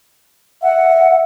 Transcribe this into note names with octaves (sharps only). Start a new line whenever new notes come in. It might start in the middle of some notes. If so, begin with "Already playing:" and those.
E5 F#5